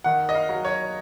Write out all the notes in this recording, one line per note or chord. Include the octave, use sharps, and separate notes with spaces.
D#3 F#5
D#5
F5
F#3
C#5